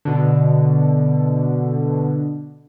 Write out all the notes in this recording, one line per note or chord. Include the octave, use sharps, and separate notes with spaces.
B2 D3